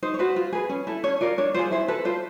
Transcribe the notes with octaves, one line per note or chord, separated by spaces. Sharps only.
D#4 C5
C#5
F#4 B4 C5
F4
G#4 B4
C#4
E4 A4
C#4 C#5
F4 A#4 D5
D4 C#5
F4 G#4 C5
E4 C5
A4 B4
F4 C5